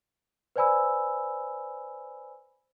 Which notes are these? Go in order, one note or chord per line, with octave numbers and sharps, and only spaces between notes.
B4 C5 D5 G#5 B5 E6